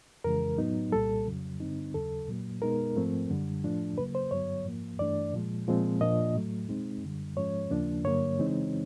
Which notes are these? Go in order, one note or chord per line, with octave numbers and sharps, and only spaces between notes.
F2 C#3 E3 G#3 A#4
A2 F#3 B3 D#4
C2 A#2 G3 A4
F2 C#3 F#3
G2 D3 G3 C4 D#4
D#2 C#3 F#3 A4
A#2 F#3 A#3
B2 G#3 B3 D#4 A#4
G#2 F3 A3 C4
F#2 D3 G3
A2 F3 A3 D4
C#3 F#3 A#3 B4
C5
G2 D3 F#3 B3 C#5
G#2 F3 A#3
G2 E3 A3 D4 D5
A#2 F3 G#3
A#2 F3 G#3 C4
A#2 F3 A#3 D4 D#5
A2 F#3 A3
B2 G#3 C4 D#4
F#2 D3 G3
G#2 F3 G#3 C#4 C#5
D#2 C#3 F3 A#3 D4
G2 D3 F#3 A#3 C#5
C#3 E3 G#3 C4 D#4